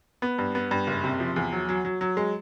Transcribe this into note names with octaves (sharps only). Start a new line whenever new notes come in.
B3
G2
B3
G2
F#1
C3
F3
E2
F#3
F#3
F#3
F#3
G#3